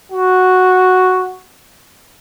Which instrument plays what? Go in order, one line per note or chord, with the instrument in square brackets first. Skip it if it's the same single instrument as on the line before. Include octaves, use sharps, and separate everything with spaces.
[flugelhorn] F#4